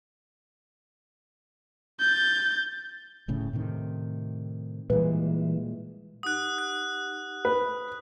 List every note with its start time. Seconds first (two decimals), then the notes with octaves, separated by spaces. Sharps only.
2.00 G6 A6
3.28 D1 A2 C#3
3.53 A2 C3 D#3
4.90 A#2 E3 G3 G#3
6.23 D#4 G4 F#5 D#6 F#6
6.58 F#6
7.45 B4